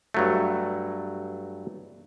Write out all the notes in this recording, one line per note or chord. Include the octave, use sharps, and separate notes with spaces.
G2 F#3 A3